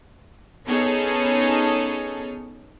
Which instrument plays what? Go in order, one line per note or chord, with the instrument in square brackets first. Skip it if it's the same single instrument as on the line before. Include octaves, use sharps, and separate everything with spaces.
[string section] B3 C#4 D#4 G#4 A4 C#5